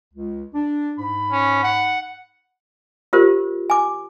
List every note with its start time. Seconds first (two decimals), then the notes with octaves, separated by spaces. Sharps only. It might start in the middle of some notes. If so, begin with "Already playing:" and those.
0.14 C#2
0.54 D4
0.99 G#2 B5
1.32 C#4
1.63 F#5
3.13 F4 G4 A#4 C5
3.70 G#5 D6